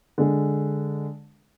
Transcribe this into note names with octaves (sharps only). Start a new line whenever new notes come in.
D3 G#3